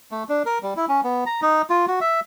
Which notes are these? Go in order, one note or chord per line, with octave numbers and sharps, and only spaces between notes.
A3
D4
A#4
G3
E4
C#4
B3
A#5
D#4
F4
F#4
E5